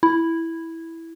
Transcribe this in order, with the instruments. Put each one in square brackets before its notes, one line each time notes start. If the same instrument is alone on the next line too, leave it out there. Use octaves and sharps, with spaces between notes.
[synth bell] E4